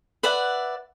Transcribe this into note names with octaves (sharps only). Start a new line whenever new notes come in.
B4 D5 E5 F#5